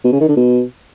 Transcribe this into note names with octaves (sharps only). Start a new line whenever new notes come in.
B2
C#3
D#3
D3
B2